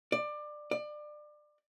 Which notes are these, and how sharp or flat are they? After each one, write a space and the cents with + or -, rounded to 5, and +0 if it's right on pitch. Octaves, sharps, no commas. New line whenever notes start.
D5 +20
D5 +25